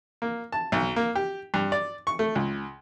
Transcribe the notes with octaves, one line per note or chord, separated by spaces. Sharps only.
A#3
A5
B1
A#3
G4
G2
D5
C#6
A3
C#2